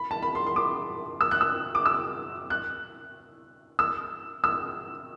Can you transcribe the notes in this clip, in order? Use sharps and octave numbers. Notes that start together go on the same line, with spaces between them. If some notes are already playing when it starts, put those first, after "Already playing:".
Already playing: B5
A5
B5
C6
C6
D6
E6
F#6
E6
D6
E6
F#6
E6
E6